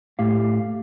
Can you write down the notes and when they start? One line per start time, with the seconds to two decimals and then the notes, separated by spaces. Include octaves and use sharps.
0.19 A2 G4 F5